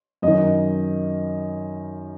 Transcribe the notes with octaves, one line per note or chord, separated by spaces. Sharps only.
F#2 D#3 D#5